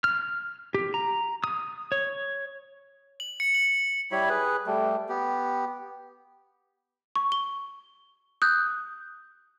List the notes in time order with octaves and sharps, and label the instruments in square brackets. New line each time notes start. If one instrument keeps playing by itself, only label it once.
[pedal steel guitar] F6
G4
A#5
D#6
C#5
[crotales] F#7
C#7
F#7
[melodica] G3 E4 C#5 B5
G#4 B4
G3 A3
B3 G4
[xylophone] C#6
G7
D#6 F#6 G6